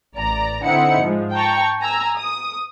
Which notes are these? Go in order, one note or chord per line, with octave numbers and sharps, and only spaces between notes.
A1 D5 A#5
D3 C4 D#4 E4 F#5 C#7
G#2 F3 G#3
G5 A5 A#5 C#6
G#5 A#5 E6
D#6